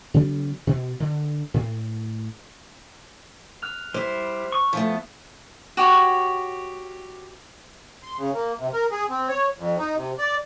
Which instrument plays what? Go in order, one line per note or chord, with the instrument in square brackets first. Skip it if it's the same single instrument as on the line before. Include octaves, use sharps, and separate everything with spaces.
[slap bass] C#3 F#3 G3 B3
B2
D3
A2
[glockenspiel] F6 F#6 F7
[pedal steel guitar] G3 E4 [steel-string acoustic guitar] C5
[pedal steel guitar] C#6
[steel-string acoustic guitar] F3 A3 [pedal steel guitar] B3
[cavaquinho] F#4 G4 C#5
[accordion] C6
C#3
A#3
C3
A#4
G#4
C4
C#5
F2
D#4
C3
D5